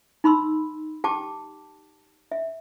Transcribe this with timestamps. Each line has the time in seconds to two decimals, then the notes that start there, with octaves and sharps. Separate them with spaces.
0.24 D#4 B5 C6 E6
1.04 G4 G5 A5 D6
2.32 E5